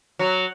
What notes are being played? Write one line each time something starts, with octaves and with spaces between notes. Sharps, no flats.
F#3